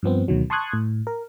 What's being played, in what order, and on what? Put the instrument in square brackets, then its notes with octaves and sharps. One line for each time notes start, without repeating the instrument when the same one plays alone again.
[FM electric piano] G2 F3 B3 C4
D2 B2 D#3 F#3
A5 C6 C#6 D#6 F#6 G#6
A2
A#4